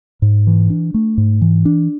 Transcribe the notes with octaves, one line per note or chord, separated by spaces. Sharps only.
G#2
E3
D4
A3
G#2
E3
D4